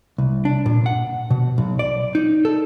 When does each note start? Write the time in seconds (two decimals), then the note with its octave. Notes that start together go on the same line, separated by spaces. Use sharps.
0.18 C2
0.45 D4
0.66 A#2
0.86 F#5
1.30 B2
1.58 B1
1.79 D5
2.15 D#4
2.45 A4